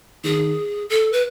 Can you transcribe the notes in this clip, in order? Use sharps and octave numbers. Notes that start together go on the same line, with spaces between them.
D#3 G#4
A4
B4